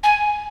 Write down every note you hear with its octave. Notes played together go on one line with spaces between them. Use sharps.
G#5